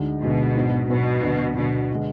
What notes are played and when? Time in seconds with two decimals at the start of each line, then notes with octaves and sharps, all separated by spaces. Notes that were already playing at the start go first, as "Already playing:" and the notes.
Already playing: D2 D3 G#3 D#4
0.22 D2 B2 D3 G#3 D#4
0.55 G#2 F#3 B3 D4
0.90 G#2 B2 F#3 B3 D4
1.23 D2 D3 F#3
1.56 D2 B2 D3 F#3
1.92 D3 G#3